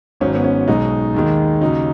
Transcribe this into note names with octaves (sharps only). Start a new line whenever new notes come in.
G#1 G#2 F#3 C#4
B3
C#4
B1 B2 G#3 D#4
D#2 D#3 G#3
D#2 C#3 F#3 D#4